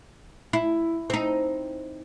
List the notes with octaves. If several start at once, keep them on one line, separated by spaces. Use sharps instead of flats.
E4
C4 D#4